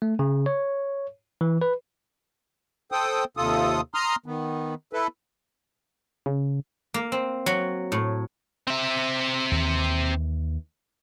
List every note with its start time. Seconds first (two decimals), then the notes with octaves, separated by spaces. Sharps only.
0.02 A3
0.19 C#3
0.46 C#5
1.41 E3
1.62 B4
2.92 A4 C5 G5 D#6
3.37 D#2 C3 F4 A4 D#6
3.94 A#5 C6 D#6 F6
4.26 D#3 B3
4.93 E4 A4 B4
6.26 C#3
6.94 A#3
7.12 C4
7.46 F#3
7.92 A2
8.67 C4 E5
9.51 D#2 E3